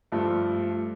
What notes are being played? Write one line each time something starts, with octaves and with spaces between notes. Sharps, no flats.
G2 F3 A3